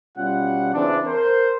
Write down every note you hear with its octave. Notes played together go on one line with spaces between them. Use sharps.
B2 G3 C#4 F4 F#5
C#3 E3 C4 D4
A#4 C5